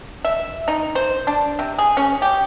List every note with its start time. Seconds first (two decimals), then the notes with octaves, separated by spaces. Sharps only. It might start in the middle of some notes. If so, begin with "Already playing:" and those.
0.24 E5
0.68 D#4
0.95 C5
1.27 D4
1.59 C3
1.78 G#4
1.97 C#4
2.22 G4